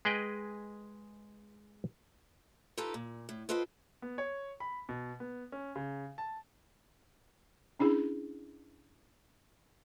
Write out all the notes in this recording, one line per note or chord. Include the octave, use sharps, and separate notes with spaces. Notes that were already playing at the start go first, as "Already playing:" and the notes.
G#3 G#4 B4 D#5 G5
D#4 F4 G4 A4 B4
A#2
A2
F4 A4 B4 C5 D#5 G5
B3
C#5
B5
B2
B3
C#4
C#3
A5
C#4 D4 E4 G#4